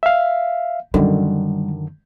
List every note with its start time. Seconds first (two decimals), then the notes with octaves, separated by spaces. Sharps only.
0.03 E5 F5
0.94 F#2 D3 D#3 G3